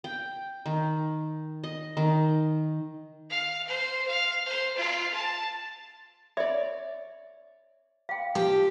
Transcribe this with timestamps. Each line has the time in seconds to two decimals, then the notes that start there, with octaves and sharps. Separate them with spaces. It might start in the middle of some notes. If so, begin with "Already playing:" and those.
0.04 G5
0.66 D#3
1.64 D#5
1.97 D#3
3.30 F5
3.67 C5
4.07 F5
4.46 C5
4.76 F4
5.14 A5
6.37 C#5 D5 E5
8.09 F5 G5
8.35 F3 G4